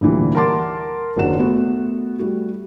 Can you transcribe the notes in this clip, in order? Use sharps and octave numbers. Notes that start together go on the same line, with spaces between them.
D2 A#2 E3 G3
A#4 F#5 A5 C6 D6 A6
F#1 D#2 F#3 D4 F#5 E7
A3 B3 F#4
G3 A3 F#4